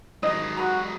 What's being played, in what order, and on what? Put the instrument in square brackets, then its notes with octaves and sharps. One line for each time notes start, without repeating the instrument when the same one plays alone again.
[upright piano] G#1 D#4 [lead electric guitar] F#3 G#3 [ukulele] D#5
[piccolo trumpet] F#4 [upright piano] A#5 B5 D#6